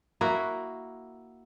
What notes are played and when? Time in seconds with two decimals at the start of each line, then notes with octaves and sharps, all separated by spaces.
0.21 A#3 E4 F#4